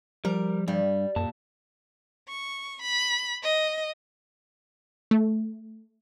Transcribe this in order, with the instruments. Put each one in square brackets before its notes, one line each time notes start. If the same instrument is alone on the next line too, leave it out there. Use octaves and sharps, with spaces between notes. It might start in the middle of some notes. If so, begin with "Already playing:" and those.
[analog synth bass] F3 [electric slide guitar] G3 [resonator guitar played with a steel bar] A#4
[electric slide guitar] G2 [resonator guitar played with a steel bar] G3
[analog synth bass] F#2 [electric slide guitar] A#2 A5
[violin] C#6
B5
D#5
[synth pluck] A3